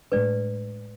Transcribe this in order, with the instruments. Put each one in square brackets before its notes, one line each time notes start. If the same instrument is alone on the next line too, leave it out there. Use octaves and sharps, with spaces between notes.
[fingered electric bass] A2 G#3 D4 [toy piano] B4 D5